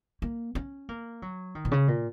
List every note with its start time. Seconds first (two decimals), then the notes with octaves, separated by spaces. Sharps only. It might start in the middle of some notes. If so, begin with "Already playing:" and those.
0.22 A#3
0.55 C#4
0.89 A#3
1.22 F#3
1.55 D#3
1.65 A#2
1.71 C#3
1.88 A#2